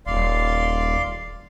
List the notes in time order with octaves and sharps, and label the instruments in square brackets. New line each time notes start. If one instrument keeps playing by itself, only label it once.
[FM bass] D#1 [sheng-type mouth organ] D5 F5 C6